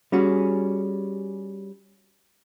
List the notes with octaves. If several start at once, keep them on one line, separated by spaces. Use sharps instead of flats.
G3 C#4 F#4 G#4